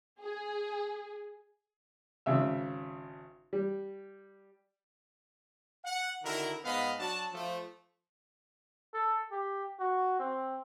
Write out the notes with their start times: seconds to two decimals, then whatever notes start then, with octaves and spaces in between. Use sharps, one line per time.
0.21 G#4
2.26 G#1 C#3 E5 E6
3.53 G3
5.85 F#5
6.24 D3 D#3 E4 F#4 A#4
6.65 G#2 B3 D#5 F5 B5
6.99 F#3 D4 F#4 A5
7.33 F3 A3
8.93 A4
9.31 G4
9.79 F#4
10.19 C4